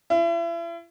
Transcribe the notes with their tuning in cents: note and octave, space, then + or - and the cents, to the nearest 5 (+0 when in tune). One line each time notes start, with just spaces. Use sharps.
E4 +40